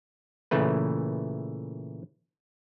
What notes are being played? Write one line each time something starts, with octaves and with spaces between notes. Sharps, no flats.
A#2 C#3 E3 A3 B4